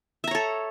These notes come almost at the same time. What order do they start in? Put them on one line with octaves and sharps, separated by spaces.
E5 A#5 C#5 A4